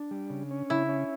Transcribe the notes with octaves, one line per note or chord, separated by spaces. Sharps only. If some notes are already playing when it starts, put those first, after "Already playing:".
Already playing: D4
G3
C#3
C#4
C#3 E4
C#4